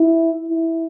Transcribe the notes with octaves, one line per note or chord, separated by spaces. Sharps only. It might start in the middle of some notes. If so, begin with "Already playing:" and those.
Already playing: E4
E4